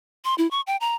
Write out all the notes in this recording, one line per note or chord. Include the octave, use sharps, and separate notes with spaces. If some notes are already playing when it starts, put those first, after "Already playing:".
C6
E4
C#6
G5
A#5